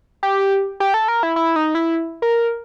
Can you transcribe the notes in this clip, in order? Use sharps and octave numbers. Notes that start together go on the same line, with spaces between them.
G4
G4
A4
A#4
E4
E4
D#4
E4
A#4